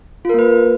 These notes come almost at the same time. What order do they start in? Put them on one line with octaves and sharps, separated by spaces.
F4 A#4 A#3 B4